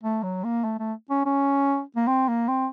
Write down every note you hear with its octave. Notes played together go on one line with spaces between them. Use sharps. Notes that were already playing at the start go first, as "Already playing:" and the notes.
A3
F#3
A#3
A3
A3
C#4
C#4
A#3
C4
A#3
C4